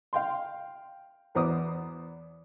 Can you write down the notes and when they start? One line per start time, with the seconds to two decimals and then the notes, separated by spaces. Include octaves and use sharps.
0.13 F5 G5 C6
1.35 E2 B3 C5 A#5 D6 D#6